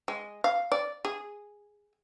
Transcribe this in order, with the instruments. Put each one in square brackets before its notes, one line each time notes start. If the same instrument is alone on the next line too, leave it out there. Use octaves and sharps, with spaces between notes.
[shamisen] G#3
F5
D5
G#4